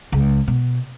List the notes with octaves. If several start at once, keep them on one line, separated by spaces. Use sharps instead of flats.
C#2
B2